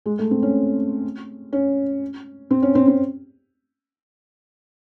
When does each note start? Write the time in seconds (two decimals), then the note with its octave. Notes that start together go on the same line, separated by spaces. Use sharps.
0.06 G#3
0.19 A3
0.31 C4
0.42 C#4
1.53 C#4
2.51 C4
2.62 C#4
2.75 C4
2.88 C4